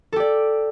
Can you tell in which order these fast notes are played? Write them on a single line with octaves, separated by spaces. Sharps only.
A4 G4 D5